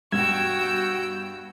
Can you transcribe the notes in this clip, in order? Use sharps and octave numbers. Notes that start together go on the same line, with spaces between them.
G2 B2 F#4 G5 E6 G#6